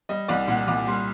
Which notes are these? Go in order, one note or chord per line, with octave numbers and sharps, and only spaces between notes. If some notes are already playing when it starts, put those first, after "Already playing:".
G3 D#5
C2 D5
A#2 F#5
C2 D6
G3 C6